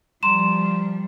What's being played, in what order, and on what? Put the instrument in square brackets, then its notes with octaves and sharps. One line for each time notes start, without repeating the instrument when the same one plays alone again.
[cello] F3 G3 [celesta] A#5 C6 E7